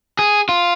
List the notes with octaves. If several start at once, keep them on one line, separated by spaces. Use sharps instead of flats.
G#4
F4